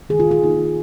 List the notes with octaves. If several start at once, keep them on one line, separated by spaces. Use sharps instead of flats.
D#3 G#4
F4
G#4
A#3 D#4